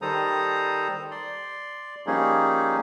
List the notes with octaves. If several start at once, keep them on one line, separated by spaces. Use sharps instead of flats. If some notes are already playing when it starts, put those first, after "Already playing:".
D#3 G3 A4 C5 A#5 D#6
D5 C6
F3 G3 A#3 C#4 D#4 G#4